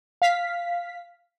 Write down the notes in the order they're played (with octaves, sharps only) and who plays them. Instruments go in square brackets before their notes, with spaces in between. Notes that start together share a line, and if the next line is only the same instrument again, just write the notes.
[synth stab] F5 B6